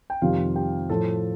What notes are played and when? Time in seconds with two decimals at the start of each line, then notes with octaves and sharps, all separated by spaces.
0.10 G5
0.22 F2 C3 D#3 G3 F4 F5
0.56 G4 G5
0.89 A2 F3 A4 A5